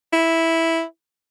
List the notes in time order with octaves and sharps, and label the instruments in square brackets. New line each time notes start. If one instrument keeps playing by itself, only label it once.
[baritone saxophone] E4